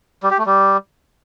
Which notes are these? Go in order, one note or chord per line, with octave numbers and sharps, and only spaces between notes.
G3
G4
A3
G3